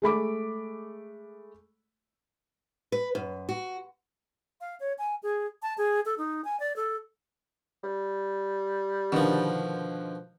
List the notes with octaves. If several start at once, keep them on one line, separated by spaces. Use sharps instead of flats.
G#3 A3 B5 D6
B4
F#2
F#4
F5
C#5
G#5
G#4
A5
G#4
A4
D#4
G#5
D5
A4
G3
B2 D3 D#3 F3